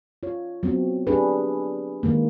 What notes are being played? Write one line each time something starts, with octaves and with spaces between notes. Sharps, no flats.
F4 C#5
F#3 B3 C4
D4 G4 G#4 B4
D#3 G#3 A#3